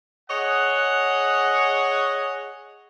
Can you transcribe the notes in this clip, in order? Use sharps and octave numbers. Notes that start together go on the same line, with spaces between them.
G#4 C#5 D#5 F#5